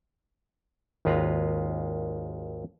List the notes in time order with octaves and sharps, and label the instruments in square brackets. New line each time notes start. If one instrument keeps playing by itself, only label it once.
[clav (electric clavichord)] G#1 D#2 G#3 F4 B4 A#5